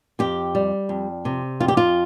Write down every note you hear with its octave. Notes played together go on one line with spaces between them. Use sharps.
F2 G4
G3
F2
C3
F2 F4
G4
F4